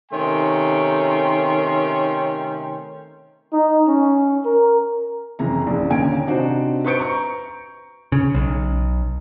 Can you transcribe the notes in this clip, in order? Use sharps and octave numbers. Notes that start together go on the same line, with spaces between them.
C3 D#3 A3 C#4 G5 C6
D#4
C#4
A#4
F#1 F2 E3 A#5
A#1 C#3
D#2 A#2 D3 C#4 G#5 D7
C3 D4 D#4 F#4 C5
B4 C5 C#6 G6 C#7 D7
A#5 C#6
C#3
B1